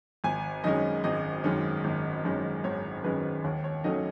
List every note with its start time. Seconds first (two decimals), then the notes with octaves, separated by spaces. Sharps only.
0.24 G#1 G#5
0.64 F#2 D#3 G#3 C#4 D#5
1.04 G#1 D#5
1.44 F#2 D#3 G#3 C#4
1.84 G#1
2.24 F#2 D#3 G#3 C#4
2.64 G#1 C#5
3.04 F#2 D#3 G#3 C#4 B4
3.44 D#2 C#5
3.64 C#5
3.84 D#3 F#3 A3 C#4 D#5